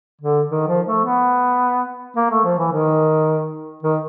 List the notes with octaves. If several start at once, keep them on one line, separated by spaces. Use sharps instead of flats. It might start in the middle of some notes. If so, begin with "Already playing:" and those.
D3
D#3
F3
A3
B3
A#3
A3
F3
E3
D#3
D#3